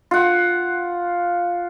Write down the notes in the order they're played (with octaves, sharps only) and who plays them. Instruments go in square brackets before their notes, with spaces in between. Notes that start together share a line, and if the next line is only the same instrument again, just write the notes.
[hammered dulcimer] F4 F#5